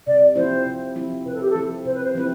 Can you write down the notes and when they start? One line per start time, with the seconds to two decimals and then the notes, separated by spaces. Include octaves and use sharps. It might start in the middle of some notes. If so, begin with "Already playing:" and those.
0.07 C3 D5
0.36 F3 C4 E4 C5
0.66 C3
0.96 F3 C4 E4
1.26 C3 B4
1.34 A4
1.41 G4
1.49 A4
1.55 F3 C4 E4
1.85 C3 C5
1.94 B4
2.03 C5
2.15 F3 C4 E4 B4